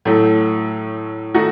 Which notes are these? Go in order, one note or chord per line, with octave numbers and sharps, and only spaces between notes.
A2 F#3 A3
D#3 A3 D#4 F#4